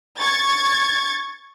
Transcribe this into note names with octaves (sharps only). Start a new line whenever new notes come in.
C#6 G#6 A6